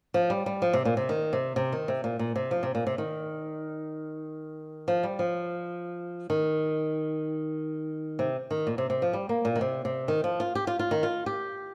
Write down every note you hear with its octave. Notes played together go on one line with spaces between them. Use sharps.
F3
G3
G3
F3
C3
A#2
C3
D#3
C3
C3
D#3
C3
A#2
A#2
C3
F3
C3
A#2
C3
D#3
F3
G3
F3
D#3
C3
D#3
A#2
C3
C3
F3
G3
A#3
A#2
D#3
C3
C3
D#3
F3
F4
G4
F4
F4
D#3
F4
G4